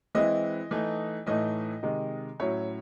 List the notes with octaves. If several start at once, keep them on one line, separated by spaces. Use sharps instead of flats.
E3 G#3 C4 E4 D#5
E3 A3 D#4
A2 E3 A3 D#4 D#5
C3 D#3 G#3
A2 F#3 C#4 E4 C#5